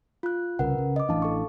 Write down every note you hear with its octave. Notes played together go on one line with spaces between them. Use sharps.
F4 F#6
C2 C#3 A#4 B4 F#5
C#3
D#5 D6
A1 E3 D4 F5 A5
A4 C#6